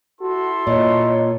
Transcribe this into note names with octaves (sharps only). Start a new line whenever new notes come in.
E4 F#4 A4 C6
A#2 C#5 D#5